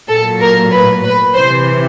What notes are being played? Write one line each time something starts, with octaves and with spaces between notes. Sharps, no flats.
A#2 F#3 A4
A#4
B4
B4
C3 E3 C5